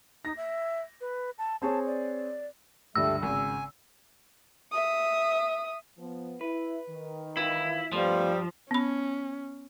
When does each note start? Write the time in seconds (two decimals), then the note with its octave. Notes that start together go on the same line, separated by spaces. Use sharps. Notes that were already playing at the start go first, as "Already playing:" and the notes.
0.25 D#4 A#6
0.37 E5
1.01 B4
1.38 A5
1.62 C4 G#4 C#5 A5
1.86 D5
2.96 C#2 G2 D3 G3 A3 E6
3.23 G#1 C#3 G#5
4.72 E5 D#6
5.99 F3 B3
6.41 E4 B4
6.89 D#3
7.37 E3 E4 F4 B4
7.92 G2 F3 G3 A3 B3 C5 F5
8.71 B3 C#4 B5